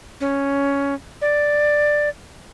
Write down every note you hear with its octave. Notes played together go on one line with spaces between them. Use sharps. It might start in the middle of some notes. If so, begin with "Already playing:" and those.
C#4
D5